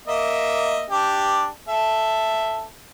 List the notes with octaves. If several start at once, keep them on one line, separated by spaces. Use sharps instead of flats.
A#3 D#5 E5
D4 G4
A4 E5